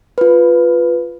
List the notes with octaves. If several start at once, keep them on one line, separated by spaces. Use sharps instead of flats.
F4 B4